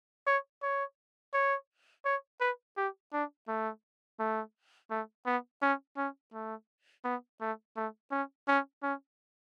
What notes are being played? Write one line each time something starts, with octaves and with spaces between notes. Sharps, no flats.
C#5
C#5
C#5
C#5
B4
G4
D4
A3
A3
A3
B3
C#4
C#4
A3
B3
A3
A3
C#4
C#4
C#4